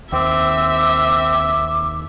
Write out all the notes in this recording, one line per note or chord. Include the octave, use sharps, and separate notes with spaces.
D#2 C4 E5 D6